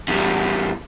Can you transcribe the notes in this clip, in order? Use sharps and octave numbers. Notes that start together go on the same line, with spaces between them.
E2 G3